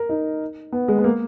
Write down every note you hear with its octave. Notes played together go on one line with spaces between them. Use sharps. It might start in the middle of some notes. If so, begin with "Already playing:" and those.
Already playing: A#4
D#4
B3
G#3
B3
A#3